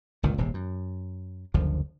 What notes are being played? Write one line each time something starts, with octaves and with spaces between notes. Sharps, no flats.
G1 C#2 A#2 D#3
D#1 G#1 C3
F#2
F#1 D2 D3 F3